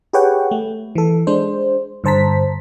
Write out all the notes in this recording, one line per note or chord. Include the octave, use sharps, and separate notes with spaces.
G4 G#4 B4 C#5 F#5 G5
A3
E3 A4
G#3 D4 C5
G2 D3 C5 A5 A#5 B6